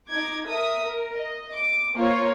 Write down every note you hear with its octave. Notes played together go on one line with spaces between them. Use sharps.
D#4 D6 G#6
A#4 E5 D#6
A#4
D#5
D6
A#3 F4 C5 C#5